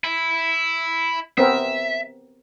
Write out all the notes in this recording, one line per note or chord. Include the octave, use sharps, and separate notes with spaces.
E4
B3 C4 A#4 E5